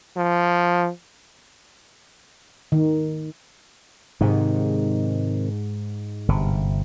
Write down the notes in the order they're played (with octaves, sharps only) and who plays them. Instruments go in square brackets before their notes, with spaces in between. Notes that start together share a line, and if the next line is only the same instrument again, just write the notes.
[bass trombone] F3
[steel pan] D#3
[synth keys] G#2 [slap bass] C3 D#3
[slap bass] G1 C3